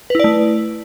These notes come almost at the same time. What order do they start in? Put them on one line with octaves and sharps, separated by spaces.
B4 E4 D5 A3